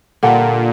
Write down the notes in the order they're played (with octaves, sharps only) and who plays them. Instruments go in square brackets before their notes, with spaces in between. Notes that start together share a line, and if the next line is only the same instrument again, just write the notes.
[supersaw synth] A#2 [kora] D3 G3 A#3